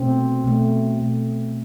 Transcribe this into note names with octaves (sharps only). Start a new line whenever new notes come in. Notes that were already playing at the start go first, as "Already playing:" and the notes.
Already playing: B2 A3 C4
B2 A3
B2 A3